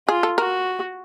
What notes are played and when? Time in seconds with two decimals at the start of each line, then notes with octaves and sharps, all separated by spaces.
0.08 F4 G#4
0.23 A4
0.38 F#4 A#4